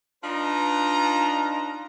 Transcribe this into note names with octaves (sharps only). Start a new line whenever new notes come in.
D4 D#4 F4 B4 A#5